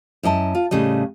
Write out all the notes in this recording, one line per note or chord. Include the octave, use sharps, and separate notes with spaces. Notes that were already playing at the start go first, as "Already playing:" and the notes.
F#2 E4 D#5 A5
F4
A2 C#3 G3 D#5